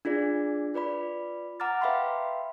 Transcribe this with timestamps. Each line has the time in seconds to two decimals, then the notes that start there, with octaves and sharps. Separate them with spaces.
0.05 D4 F4 G#4 D5
0.74 F4 B4 D5 B5
1.60 F#5 A#5 D6 F6 A6
1.81 B4 E5 F5 G5 B5 C6